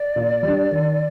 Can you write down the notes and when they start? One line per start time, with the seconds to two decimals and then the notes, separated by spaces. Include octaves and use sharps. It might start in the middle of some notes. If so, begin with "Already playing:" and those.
Already playing: D5
0.16 A#2
0.43 G3 D4
0.71 D#3